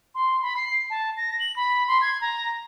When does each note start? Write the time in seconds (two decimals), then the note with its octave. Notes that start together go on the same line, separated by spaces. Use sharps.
0.15 C6
0.42 B5
0.57 C7
0.90 A5
1.17 A#6
1.40 F#7
1.56 B5
1.88 C6
2.02 G#6
2.21 A#5